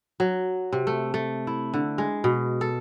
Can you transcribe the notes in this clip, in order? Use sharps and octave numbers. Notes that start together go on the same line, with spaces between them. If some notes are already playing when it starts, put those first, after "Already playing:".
F#3
C3
A3
A3
E4
D3
G#3
B2
A4